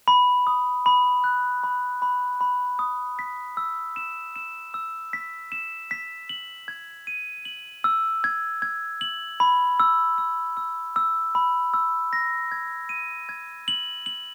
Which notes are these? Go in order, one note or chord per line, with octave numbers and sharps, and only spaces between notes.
B5
D#6
B5
F#6
B5
B5
B5
D#6
B6
E6
E7
E7
E6
B6
E7
B6
F#7
G#6
D#7
F#7
E6
G#6
G#6
F#7
B5
E6
E6
E6
E6
B5
E6
A#6
G#6
D#7
G#6
F#7
F#7